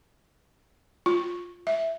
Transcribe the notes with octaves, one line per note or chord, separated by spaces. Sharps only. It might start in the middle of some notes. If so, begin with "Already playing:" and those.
F4
E5